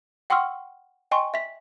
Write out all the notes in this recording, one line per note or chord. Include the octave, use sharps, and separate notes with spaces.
F#5 G5 C6 C#6 E6 F6
D#5 G5 G#5 C6 C#6
E5 B6